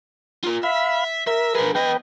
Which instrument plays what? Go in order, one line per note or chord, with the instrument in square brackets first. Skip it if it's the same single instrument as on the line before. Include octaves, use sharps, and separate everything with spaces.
[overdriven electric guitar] F4 A#4
[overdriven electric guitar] E5 [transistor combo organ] F5 B5
[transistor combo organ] A#4 [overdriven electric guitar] E5
[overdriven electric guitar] D4 G#4 [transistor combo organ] A#4 B4
[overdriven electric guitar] E2 D#5 [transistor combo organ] B4 G5